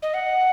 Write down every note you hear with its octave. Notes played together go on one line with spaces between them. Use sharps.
D#5
F#5